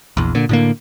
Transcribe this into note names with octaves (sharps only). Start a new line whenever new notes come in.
A#1 E2
A#2 D3
A2 D3 A#3